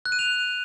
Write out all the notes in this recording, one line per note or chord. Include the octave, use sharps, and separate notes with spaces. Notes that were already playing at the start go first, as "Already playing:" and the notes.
F#6
D#7
F7